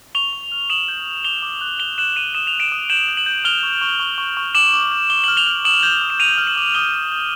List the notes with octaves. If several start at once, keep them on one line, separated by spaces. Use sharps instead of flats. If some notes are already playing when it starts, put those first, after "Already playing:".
C#6 F7 G7
C#6
F6
D#6 E7 F#7
G6
G6
D6 F7 G7
D6
F#6
F#6 F7 G7
F#6 E7 F#7
D6 D#7 F7
D#6 E7
F7
F#6
D7 E7
D#6
G6 E7 F#7
G6
E7 F#7
G6
F6 F7 G7
C#6
C#6
C#6
C#6
C#6
D6 E7 F#7
D6
G6
D6 G7
F6 F#7
F7 G7
F6
D#6 E7 F#7
G6
D#6
E7
F6 D#7 F7
F6
E7 F#7
D6
D#6 F7 G7
G6
G6